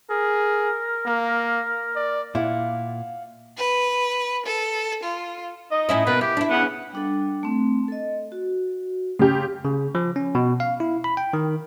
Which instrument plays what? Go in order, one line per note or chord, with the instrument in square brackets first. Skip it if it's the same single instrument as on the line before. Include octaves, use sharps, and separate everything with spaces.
[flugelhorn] G#4 [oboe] A#4
[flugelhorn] A#3
D5
[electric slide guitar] A#2 [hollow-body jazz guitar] E4 [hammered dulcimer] F5 F#5
[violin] B4
A4
F4
[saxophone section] D#4 D#5
[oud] A2 C#4 E4
[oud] B2 A#3 B3 [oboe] B4
[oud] E4 [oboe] G4
[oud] D4 E4
[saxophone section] C#3 B3 [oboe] F#5
[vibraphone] G3 D4 A4
A3 C4
A4 D#5
F#4
[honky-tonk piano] C#3 G4 [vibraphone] C6
[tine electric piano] C#3
F3
C#4
B2
F5
E4
B5
G5
D#3